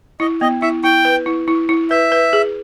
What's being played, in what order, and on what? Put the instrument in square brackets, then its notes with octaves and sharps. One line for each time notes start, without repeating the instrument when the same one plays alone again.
[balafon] E4 [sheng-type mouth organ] D#5
[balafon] B3 [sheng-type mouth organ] D#5
[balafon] E4 [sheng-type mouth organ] E5
[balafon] E4 [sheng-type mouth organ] G5
[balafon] B4
E4
E4
E4
[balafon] B4 [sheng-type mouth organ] E5
[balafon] B4
G#4